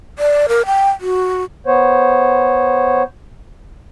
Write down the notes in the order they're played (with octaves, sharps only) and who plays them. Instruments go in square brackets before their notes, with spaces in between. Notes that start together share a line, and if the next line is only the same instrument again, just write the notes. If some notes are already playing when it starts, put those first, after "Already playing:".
[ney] D5
A#4
G5
F#4
[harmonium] B3 C5 C#5